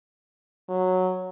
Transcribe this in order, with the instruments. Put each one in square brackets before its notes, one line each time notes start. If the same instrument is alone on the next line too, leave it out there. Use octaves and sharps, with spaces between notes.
[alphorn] F#3